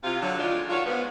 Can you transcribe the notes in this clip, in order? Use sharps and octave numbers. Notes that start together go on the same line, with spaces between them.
C3 F4
D3 F#3
A2 D#3 G#3 D4 F4
D#3 D4 F4 F#4 C#5 F5
G#2 B3